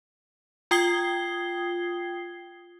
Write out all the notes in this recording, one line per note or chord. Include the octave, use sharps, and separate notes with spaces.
F4 G5 D#6 G#6 C7 G7